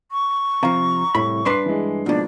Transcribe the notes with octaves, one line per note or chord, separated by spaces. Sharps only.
C#6
C3 F3 F5 A#5
C2 A2 B5
G2 D4 B4 C6 D6 C7
E3 G#3
G#2 B2 F3 A#3 D4